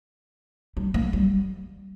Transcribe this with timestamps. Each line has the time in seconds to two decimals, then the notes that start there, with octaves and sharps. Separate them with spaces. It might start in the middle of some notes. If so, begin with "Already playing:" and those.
0.77 G3
0.94 A#3
1.13 G3